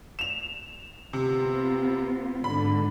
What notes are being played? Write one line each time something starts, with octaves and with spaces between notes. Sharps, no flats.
E7 F7
C3 B3 C4 F4
G#2 D3 B5